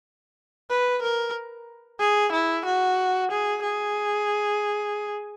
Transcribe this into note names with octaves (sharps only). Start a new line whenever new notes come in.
B4
A#4
G#4
E4
F#4
G#4
G#4